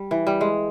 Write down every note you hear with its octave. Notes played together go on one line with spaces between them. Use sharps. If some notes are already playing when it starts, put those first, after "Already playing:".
Already playing: G3
E3
G3
G#3